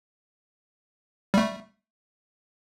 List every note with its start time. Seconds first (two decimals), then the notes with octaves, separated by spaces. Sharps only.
1.34 G3 A3